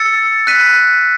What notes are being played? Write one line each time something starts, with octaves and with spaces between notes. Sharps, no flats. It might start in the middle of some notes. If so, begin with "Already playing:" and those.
Already playing: E6 A6 C#7
F#6 B6 D#7